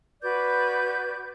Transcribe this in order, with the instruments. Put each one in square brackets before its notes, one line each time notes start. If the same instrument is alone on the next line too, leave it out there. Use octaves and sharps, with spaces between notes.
[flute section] F#4 B4 D5 G6